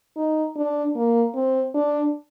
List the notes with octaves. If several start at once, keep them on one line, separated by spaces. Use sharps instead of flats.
D#4
D4
A#3
C4
D4